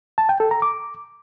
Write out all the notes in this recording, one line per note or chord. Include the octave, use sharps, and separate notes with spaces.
A5
G5
A4
A#5
D6